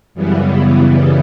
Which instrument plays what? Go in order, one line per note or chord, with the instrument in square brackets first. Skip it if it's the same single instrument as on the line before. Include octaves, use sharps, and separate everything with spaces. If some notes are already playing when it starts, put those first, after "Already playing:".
[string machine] F#2 C#3 E3 G3 B3